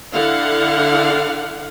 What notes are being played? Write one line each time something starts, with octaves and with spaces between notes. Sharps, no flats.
D3 E4 F5 F#5